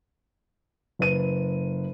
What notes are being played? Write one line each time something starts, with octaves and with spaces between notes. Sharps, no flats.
F#1 B4 D#7